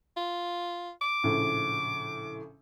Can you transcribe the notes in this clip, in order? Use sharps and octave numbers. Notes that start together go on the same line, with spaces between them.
F4
D6
A#1 A2 C#3